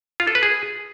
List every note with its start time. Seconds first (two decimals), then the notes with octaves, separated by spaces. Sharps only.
0.20 F4
0.27 A4
0.35 B4
0.43 G#4